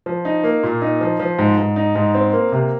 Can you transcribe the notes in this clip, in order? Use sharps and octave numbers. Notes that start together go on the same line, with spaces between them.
F3
D#4
A#3
A#2
D#4
F3
F3
G#2
G#2
D#4
G#2
C4
A#3
C3